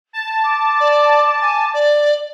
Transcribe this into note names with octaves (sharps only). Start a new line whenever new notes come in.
A5
D6
D5
G#5
D5